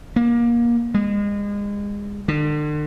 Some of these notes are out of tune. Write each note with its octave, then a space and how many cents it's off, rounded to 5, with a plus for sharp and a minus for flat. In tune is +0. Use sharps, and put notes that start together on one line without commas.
A#3 +25
G#3 -30
D3 +40